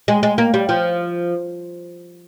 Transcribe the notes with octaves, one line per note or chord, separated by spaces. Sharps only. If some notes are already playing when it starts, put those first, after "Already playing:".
G#3
G#3
A#3
G3
F3